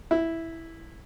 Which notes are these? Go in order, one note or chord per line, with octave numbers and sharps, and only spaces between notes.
E4